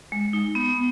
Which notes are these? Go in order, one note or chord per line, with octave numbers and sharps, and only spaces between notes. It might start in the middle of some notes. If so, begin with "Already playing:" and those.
G#3
D#4
B3